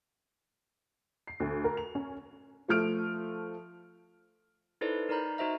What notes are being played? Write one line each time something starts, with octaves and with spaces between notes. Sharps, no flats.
C7
D2
A#4
F7
C#4
F3 A3 F6 D7
D#4 E4 A4 B4 C5 D5
D#4 A#4 D5 A#5 B5 G6
D#4 F#4 C5 D#5 E5 A#5